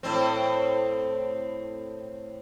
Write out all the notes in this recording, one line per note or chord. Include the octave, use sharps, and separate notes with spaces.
A2 C4